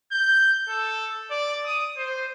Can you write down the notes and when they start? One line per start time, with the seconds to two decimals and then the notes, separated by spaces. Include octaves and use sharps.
0.12 G6
0.69 A4
1.31 D5
1.66 D#6
1.97 C5